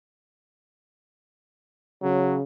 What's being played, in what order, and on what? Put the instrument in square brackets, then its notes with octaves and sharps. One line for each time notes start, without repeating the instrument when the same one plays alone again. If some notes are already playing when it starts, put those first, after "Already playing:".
[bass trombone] C#3 [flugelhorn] F#3